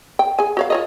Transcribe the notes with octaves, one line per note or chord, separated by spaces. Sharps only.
G5
G#4 G#5
F#4 C#5 F5
F4 C#5 D#5